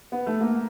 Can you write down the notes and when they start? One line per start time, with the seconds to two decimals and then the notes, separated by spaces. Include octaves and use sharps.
0.12 B3
0.27 A3
0.41 A#3